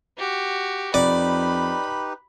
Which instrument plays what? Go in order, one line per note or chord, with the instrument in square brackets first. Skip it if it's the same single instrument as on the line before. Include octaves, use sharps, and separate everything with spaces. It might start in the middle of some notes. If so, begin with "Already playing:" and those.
[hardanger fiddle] F#4 G4
[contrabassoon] F2 [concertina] D#4 G4 B4 [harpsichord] D5 [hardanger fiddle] B5